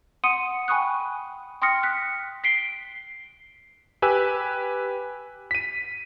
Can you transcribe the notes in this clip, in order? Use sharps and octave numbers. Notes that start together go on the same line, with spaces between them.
F#5 C6 D#6 C#7 D#7
G5 G#5 B5 C#6 D#6 F#6
G5 C6 D#6 F6 A#6 C#7
F#6 B6
B6 C7 D7 G7
G4 B4 G#5 E6 F#6
B6 D#7